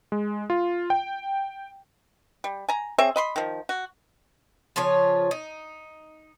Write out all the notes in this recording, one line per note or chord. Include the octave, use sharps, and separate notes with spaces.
G#3
F4
G5
G3
G#5 A#5
C4 G#4 C#5 E5
D#5 B5 C6
D#3 F3
F#4
C#3 F3 F4 C#5
D#4